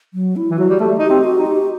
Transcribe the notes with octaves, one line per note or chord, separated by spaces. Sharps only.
F#3
E4
E3
F#3 F#4
G3
A3 G4
D#4 G4
C4
F#4
D#4
G4